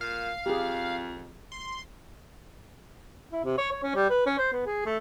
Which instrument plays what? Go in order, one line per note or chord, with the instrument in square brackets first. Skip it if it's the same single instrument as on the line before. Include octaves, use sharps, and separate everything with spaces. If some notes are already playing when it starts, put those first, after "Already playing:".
[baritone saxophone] A#2 [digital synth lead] F5
[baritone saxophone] F2 [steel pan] G4 G#4
[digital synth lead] C6
[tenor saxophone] E4
C3
C#5
C#5
C#4
G3
B4
C#4
C5
B3
G#4
A3